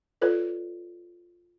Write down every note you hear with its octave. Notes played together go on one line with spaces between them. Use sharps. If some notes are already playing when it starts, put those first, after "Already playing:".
F4 A4 B4 C#5 D5